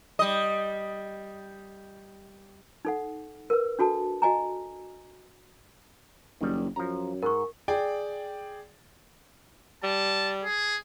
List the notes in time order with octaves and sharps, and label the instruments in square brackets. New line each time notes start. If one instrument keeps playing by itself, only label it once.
[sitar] G3 D#5
[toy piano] D#4 A4 F#5
A#4 B4
D4 F#4 A4 A5
F#4 D#5 G#5 A#5
[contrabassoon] F#1 [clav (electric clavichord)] D#3 G3
[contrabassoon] F#2 [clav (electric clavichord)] F3 A#5
[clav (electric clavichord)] G#2 [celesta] A#4 C#6
[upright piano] G#4 D5 G5
[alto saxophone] G3 [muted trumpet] A5
[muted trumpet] G#4